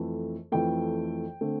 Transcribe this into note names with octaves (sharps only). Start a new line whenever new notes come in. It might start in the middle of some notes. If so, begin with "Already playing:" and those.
Already playing: F2 E3 A3
F2 E3 A3 G5
D3 A3 C4